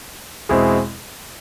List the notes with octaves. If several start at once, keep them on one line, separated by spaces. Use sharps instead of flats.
E2 B2 G#3 C4 E4